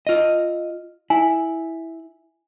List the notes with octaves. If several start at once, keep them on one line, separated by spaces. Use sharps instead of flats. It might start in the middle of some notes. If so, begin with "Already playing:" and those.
F4 D#5
E4 G#5